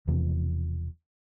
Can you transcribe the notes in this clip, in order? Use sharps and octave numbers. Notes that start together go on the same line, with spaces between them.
E1 E2 C3 F3